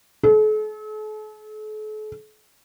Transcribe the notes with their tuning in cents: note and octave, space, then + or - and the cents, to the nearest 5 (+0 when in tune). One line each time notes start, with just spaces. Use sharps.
A4 -45